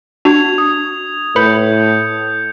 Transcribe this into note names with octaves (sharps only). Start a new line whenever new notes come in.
D4 F#4 G#6 F7
D#6 F7
A2 B4 B5 G6 C#7